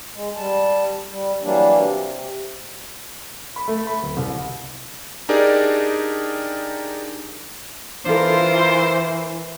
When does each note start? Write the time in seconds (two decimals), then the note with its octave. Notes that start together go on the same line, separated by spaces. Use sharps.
0.15 G#3
0.36 G3 A5
1.10 G3
1.42 E3 F#3 G3 A#3 D4
1.78 C3
3.56 B5
3.68 A3
3.87 B5
4.02 D1
4.17 C2
5.29 D4 D#4 G4 G#4 A#4 D5
8.05 E3 D4 F4 A4 A#4 C5